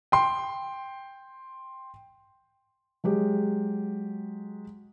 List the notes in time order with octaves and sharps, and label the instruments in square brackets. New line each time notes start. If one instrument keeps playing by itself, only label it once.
[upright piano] G5 C6
[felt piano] F#3 G#3 G4